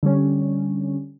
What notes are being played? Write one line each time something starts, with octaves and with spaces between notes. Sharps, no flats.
D3 G3 C#4